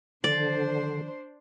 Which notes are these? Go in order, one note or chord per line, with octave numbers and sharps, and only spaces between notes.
D3 D#3 F3 D4 C5 D5